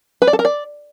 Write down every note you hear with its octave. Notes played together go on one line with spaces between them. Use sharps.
B4
D5
A4
A#4
D5